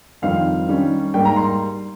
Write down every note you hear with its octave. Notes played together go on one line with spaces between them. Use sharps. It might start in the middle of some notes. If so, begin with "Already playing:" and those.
F2 D#3 G3 C4 F5
D#3 G3 C#4
G#2 G3 A#3 G5
A#5
C6